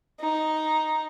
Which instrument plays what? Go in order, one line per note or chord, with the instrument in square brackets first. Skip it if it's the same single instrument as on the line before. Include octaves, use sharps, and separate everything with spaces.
[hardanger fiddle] D#4